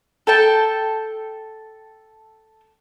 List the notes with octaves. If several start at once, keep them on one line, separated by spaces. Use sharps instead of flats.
A4 G5 A5